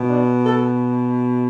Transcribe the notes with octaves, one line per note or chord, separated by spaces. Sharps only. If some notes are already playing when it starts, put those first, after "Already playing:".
Already playing: B2
D4
A4